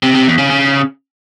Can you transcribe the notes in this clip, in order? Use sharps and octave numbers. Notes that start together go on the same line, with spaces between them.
C3
C3
E2
C#3
C#3